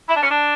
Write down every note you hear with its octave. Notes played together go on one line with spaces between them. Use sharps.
E4
D4
C#4
D4